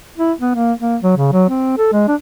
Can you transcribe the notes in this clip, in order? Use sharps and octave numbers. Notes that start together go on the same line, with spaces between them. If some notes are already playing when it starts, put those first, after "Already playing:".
E4
B3
A#3
A#3
F#3
C#3
F#3
C4
A4
G#3
D4